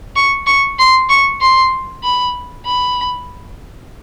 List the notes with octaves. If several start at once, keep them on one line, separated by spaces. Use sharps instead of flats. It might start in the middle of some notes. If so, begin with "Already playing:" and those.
C#6
C#6
C6
C#6
C6
B5
B5